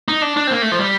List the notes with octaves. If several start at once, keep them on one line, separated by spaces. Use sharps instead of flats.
D#4
D4
D4
C4
A#3
A3
F3
G3